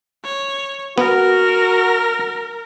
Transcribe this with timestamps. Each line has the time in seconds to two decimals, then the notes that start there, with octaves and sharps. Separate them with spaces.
0.24 C#5
0.98 B3 F#4 A#4